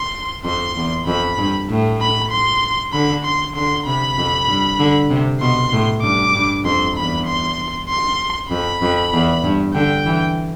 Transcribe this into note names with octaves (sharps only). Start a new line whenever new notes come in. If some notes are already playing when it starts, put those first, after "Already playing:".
Already playing: C6
F2 C6
E2
F2 B5
G2
A2
B5
C6
D3 B5
C6
D3 C6
C3 B5
F2
G2
D3
C3
B2 C6
A2
G2 D6
G2
F2 C6
E2 B5
C6
C6
F2 B5
F2
E2
G2
D3 G5
E3